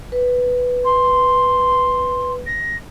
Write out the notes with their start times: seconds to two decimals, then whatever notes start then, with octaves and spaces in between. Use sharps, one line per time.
0.12 B4
0.85 C6
2.46 A#6